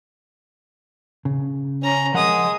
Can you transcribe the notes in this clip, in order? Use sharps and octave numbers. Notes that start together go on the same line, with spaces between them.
C#3
C#4 A#5
F3 G#3 A#4 F#5 D#6